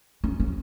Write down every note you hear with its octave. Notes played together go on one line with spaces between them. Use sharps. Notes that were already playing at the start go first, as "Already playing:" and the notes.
C#4
C4